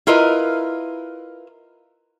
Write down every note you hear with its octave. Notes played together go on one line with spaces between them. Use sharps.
E4 F4 A#4 B4 D#5